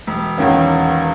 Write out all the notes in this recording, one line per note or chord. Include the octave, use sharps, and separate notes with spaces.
E1
E2 D#3 A#3 C#4